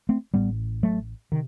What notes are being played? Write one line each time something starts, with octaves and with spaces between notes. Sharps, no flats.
A3 C4
A1 A2 G3 B3
F#3 A3
C3 D#3